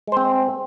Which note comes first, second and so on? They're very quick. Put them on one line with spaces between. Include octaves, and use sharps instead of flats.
G#3 C5 C4